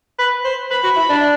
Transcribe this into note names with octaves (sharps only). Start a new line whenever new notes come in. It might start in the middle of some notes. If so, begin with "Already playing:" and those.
B4
C5
B4 B5
F#4
E4
D4